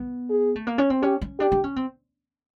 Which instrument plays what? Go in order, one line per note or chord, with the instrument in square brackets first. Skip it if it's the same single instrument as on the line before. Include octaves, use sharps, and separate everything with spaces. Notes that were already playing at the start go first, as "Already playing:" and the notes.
Already playing: [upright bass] B3
[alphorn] G#4
[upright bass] A3
A#3
C#4
C4
[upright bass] C#4 [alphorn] G4
[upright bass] C#4
[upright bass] D4 [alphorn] G4
[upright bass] D4
C#4
C4